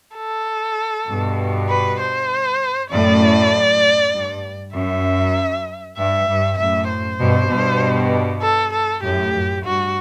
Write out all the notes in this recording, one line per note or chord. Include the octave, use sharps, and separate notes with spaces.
A4
G2 B2
B4
C5
F#2 A2 D5
G2
F#2 E5
G2 E5
G2
F#2 A2 E5
C5
G2 B2
G2 B2
A4
A4
F#2 A2 G4
F#2
G2 F#4